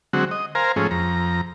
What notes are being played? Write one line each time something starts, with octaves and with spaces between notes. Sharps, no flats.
D3 F#3 G#3 C4 F#4
D#5
A#4 C5 F5 G#5 A#5
G#2 F3 A3 C#4 G#4
F2 A#5